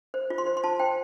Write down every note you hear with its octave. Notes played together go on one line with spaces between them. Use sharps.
C5
F4
C6
C5
C6
F4 A5
C5 G5